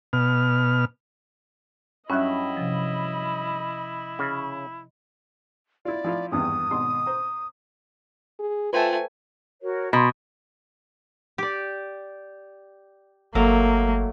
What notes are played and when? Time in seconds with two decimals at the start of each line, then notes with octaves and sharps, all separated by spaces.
0.13 B2 F6
2.10 G2 F#3 C#4 E4 D#5 E5 B5
2.57 C3 F3
4.19 C#3
5.85 E4 F4 D5
6.04 F3 E4 F4
6.31 G#1 E2 G2 D#6
6.70 G#1 B2 C6
7.06 C5 A#5
8.39 G#4
8.73 A3 F4 B4 C5 G5 G#5
9.61 F#4 A#4 C#5
9.93 B2 A#5 C6
11.38 G4 D5
13.35 G1 F#3 A3 A#3 A#4